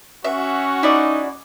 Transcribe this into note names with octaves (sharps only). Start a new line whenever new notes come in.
C#4 F#4 E5
D#4 E4 D5